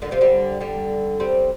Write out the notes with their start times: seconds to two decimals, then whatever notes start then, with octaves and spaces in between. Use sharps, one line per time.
0.02 A#2 D3
0.11 C3 F3
0.21 D3 G3
0.60 D3 G3
1.20 G3 C4